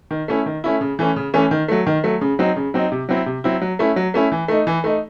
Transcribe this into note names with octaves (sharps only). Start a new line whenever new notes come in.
D#3
A3 C#4 E4
D#3
A3 C#4 E4
C#3
E3 A3 C#4
C#3
E3 A3 C#4
D#3
F#3 A3
D#3
F#3 A3
C#3
F#3 C4 D#4
C#3
F#3 C4 D#4
C3
F#3 C4 E4
C3
F#3 C4 E4
F#3
A3 C#4 E4
F#3
A3 C#4 E4
E3
A3 D#4
E3
A3 D#4